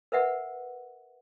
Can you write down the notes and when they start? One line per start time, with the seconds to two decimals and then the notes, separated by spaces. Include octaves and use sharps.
0.12 A#4 B4 E5 F#5